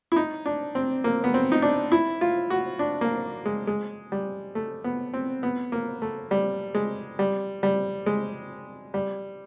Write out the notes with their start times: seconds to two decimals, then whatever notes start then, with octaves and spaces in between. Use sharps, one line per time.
0.12 E4
0.16 D#4
0.46 D4
0.75 C4
1.04 A#3
1.24 B3
1.34 C4
1.52 D#4
1.62 D4
1.92 E4
2.21 F4
2.50 F#4
2.79 D4
3.01 A#3
3.46 G#3
3.67 G#3
4.12 G3
4.55 A3
4.84 B3
5.14 C4
5.43 B3
5.72 A#3
6.02 A3
6.31 G3
6.75 G#3
7.19 G3
7.63 G3
8.06 G#3
8.94 G3